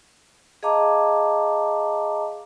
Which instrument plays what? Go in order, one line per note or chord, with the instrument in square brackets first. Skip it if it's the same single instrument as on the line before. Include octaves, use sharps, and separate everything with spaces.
[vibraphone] G#4 D#5 F5 A5 A#5 D6